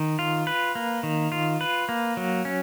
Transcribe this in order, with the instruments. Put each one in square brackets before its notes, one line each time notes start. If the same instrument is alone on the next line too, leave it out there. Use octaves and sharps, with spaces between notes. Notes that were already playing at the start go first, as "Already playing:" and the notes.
Already playing: [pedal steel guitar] D#3
F4
B4
A#3
D#3
F4
B4
A#3
F#3
C#4